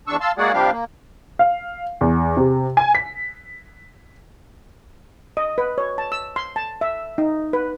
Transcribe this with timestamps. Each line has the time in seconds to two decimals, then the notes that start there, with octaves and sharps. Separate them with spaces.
0.08 E2 D4 C#6 E6
0.21 F5 A5 C6 E6
0.38 G#3 A#3 F#4 G#4 D5 F#5
0.53 C3 F3 G3 D4 G4 F5
0.72 A#3
1.39 F5
2.01 E2
2.37 C3
2.77 G#5
2.95 B6
5.37 D#5
5.58 B4
5.78 C#5
5.98 A5
6.12 E6
6.36 C6
6.56 A5
6.81 E5
7.18 D#4
7.53 B4